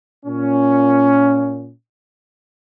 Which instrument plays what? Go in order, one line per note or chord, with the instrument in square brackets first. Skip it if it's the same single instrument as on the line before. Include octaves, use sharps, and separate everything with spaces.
[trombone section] A#2 C#4